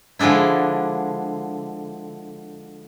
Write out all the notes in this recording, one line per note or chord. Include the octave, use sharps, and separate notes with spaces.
D3 F3 G#3 D4 E4